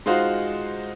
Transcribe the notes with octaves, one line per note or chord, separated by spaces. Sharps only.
G#3 D#4 F4 F#4 C5